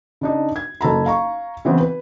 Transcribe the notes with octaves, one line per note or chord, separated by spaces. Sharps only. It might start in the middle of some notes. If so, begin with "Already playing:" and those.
C#3 D4 D#4
G#6
F#1 A4 A#5 B5
F5 A#5 C#6
C#3 E3 B3 C4
B4